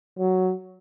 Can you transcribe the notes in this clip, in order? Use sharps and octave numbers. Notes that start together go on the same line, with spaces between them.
F#3